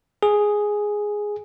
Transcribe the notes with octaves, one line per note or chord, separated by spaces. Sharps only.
G#4